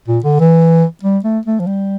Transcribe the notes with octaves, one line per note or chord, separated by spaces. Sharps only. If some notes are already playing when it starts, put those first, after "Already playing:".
A#2
D3
E3
G3
A3
A3
F3
G3